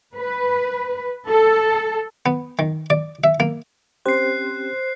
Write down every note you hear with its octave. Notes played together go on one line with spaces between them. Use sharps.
B4
A4
B3
D#3
D5
E5
A#3
C4 C#4 G4 C5 F#6 C7